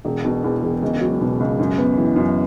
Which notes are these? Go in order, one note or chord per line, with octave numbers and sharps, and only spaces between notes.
E1
B2
E2
E1
C#2
F#3
B2
C#2
F#2
B3
E3
F#2